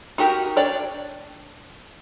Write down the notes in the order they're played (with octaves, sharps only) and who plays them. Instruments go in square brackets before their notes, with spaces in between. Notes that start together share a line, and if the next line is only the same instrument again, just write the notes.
[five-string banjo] D#4 F#4 G4 A#4
D4 C#5 D5 G5